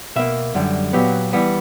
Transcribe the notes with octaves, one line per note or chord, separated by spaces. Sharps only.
B2 A#3 E5
F#2 D3 G3
A#2 F#3 B3 G4
E3 G3 B3